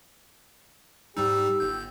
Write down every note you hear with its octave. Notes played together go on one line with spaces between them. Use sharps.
G#2 G3 D#4 G4 E6
G1 G6